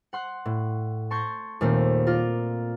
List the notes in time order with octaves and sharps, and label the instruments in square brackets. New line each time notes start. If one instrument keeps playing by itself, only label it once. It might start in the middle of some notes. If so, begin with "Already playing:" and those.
[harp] F#5 C6 F#6
A2
A5 C6 C#6 G6 G#6 A#6
D#2 A#2 A3 A#3 C4
F4 A#4 D5